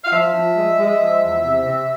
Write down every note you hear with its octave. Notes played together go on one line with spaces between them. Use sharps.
F5
F3 E5
F3
G#3
G#3
F3
E2
C3
C3